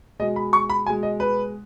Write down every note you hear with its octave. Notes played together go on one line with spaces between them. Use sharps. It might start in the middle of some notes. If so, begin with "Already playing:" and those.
B2 G#3 D#5
B5
C#6
B5
B2 G#3 G#5
D#5
B4